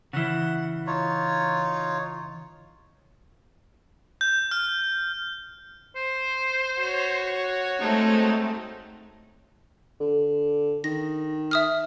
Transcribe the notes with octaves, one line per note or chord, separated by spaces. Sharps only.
C#3 E3 F#5
D#4 F4 C#5
G6
F6
C5
F#4 C#5
G#3 A3 C4 D#4
D3
D#3 A#6
E5 D#6 F6